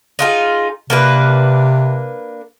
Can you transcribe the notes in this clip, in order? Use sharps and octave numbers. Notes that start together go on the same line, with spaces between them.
D#4 F4 G#4
C3 A#3 D4 B4